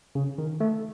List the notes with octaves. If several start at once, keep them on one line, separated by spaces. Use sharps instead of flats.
C#3
D#3
A3